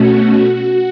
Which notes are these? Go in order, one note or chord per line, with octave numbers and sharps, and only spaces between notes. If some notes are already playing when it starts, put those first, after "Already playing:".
Already playing: B2 A3 C#4 F#4